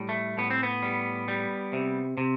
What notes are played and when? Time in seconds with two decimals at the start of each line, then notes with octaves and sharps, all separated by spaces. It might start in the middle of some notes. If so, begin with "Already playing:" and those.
Already playing: A2 G3
0.09 A3
0.38 A2 B3
0.50 C4
0.63 B3
0.82 G3
1.28 G3
1.73 C3
2.18 C3